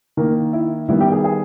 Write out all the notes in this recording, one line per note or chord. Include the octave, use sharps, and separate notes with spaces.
D#3 A#3 A#4
E4
D#3 G3 B3 E4
G4
G#4
G#4